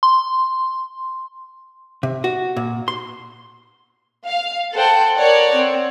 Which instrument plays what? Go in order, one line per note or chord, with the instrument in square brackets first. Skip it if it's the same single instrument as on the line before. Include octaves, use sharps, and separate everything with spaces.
[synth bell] C6
[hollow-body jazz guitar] C3
F#4
A#2
C6
[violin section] F5
A4 C5 F#5 G5
A#4 C#5 D5 F#5
C4